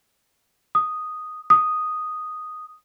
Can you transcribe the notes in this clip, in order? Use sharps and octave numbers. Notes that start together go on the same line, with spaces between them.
D#6
D#6